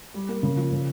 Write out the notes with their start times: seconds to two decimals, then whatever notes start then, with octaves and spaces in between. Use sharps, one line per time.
0.14 G3
0.29 A#3
0.43 C#3
0.57 F3
0.72 C#3